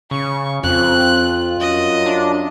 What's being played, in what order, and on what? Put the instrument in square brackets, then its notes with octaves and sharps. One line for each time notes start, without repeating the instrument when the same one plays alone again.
[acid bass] C#3 [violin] C#6
[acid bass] F2 [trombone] C4 [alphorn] F4 [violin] F#6
[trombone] F#2 [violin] D#5
[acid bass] D4